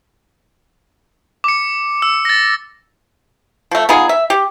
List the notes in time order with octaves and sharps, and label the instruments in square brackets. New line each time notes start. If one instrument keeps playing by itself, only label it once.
[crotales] D6 C#7
E6
A6 A#6
[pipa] F3 A3
B3 D#4 F4 G#4
E5
G4